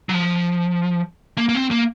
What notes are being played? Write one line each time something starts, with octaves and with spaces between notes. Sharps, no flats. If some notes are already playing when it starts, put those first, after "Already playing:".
F#3
F3
A#3
A#3
C4
A#3